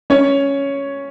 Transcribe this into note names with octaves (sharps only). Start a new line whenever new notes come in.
C#4 C#5